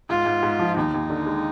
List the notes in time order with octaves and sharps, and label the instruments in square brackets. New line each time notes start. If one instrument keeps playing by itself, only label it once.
[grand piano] G#2 [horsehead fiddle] F4
[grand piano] G#2
G#2
F3
[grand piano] D#2 [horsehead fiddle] D#4
[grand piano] D#2
D3
G#3